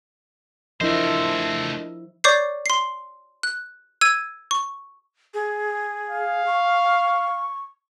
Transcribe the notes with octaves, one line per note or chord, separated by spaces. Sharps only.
F3 A3 D4 E4 A#4 C5 D#5 E5
C#5 D5 C#6 D6 G6 C7
C6 C7
F#6
E6 G#6 D#7
C#6
G#4
F5
C#6